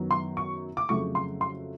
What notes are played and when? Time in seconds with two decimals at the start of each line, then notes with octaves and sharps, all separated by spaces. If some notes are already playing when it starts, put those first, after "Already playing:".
Already playing: F#2 D#3 F#3 B3
0.11 C6
0.37 C#6
0.77 D6
0.89 F2 C#3 F#3 A3 C#6
1.15 C6
1.41 C6